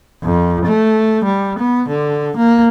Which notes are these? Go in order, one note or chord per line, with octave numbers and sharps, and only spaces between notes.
F2
A3
G3
B3
D3
A#3